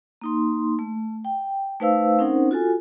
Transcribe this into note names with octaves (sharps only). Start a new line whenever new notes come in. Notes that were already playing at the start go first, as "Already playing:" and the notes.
A#3 D#4 C6
A3
G5
A3 D#4 B4 C5 F5 E6
C4 C#4 D#4 A#4 C5 F#5
F4 F#4 A4 G#5